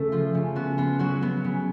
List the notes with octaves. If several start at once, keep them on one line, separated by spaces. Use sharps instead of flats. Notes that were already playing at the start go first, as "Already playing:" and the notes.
Already playing: C#3 A3 A4
F3 F4
C#3
B3 F#4
B3 F4
F#3 F#4
B3
C#3